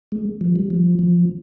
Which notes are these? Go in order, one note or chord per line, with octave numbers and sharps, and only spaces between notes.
G#3
F3
G3
F3
F3